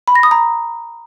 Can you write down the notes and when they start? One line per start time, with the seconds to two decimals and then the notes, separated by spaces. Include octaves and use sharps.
0.08 B5
0.15 A#6
0.23 D#6
0.31 A#5